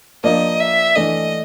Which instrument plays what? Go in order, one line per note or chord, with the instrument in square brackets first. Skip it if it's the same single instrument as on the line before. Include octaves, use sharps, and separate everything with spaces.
[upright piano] F3 A#3 D4 [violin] D#5
[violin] E5
[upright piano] E3 A3 D4 [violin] D#5